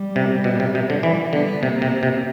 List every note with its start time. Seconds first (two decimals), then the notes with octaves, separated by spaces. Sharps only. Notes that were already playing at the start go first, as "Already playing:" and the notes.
Already playing: G3
0.16 C3
0.44 B2
0.60 C3
0.75 C3
0.90 D3
1.03 E3 G3
1.33 D3 B3
1.62 C3 A#3
1.82 C3
2.03 C3